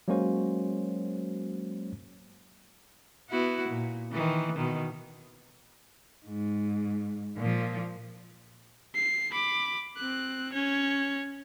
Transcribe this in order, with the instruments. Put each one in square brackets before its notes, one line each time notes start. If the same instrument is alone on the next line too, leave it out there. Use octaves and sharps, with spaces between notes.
[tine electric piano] F#3 G#3 A#3 C#4 F#4 C5
[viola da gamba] B3 E4 F#4
A#2
D#3 E3
B2 D#3
[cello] G#2
A#2 F3
[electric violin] C7
B5 D6
C4 F#6
C#4 C#5